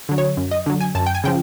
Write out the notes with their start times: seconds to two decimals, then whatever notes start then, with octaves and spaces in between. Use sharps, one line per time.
0.09 D3 F#3
0.18 C#5
0.37 F#2
0.51 D#5
0.66 D3 F#3
0.81 G#5
0.95 F#2 A5
1.06 G5
1.15 G#5
1.24 C#3 F3 G5